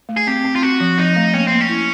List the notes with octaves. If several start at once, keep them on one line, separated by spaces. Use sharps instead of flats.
A3
G#4
C4 G4
C4
F4
C4 F#4
F3
F3 D#4
A3
A#3 C#4
A#3 C4
C#4
E4